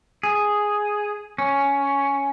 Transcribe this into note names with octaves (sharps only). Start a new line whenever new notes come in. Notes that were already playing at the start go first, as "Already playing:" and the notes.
G#4
C#4